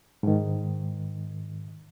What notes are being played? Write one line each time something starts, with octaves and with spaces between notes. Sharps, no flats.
G#2 D#3